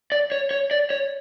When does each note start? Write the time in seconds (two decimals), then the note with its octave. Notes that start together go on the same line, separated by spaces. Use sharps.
0.12 D5
0.32 C#5
0.51 C#5
0.71 D5
0.90 C#5